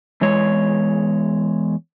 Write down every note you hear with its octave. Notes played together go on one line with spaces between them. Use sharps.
E2 G#3 C#5